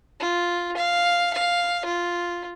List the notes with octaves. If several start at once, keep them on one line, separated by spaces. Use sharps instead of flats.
F4
F5
F5
F4